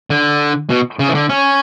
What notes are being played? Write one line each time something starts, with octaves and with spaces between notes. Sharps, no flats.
D3
B2
C#3
E3
D3
C#4